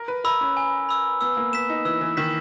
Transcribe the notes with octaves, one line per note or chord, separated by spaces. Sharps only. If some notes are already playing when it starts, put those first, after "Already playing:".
Already playing: A#4
B4
A#4 B5 E6
C#4
G#5
B5 E6
B3 E6
A#3
B3 B6 E7
D#4
E3 E6
E3
D#3 B6 E7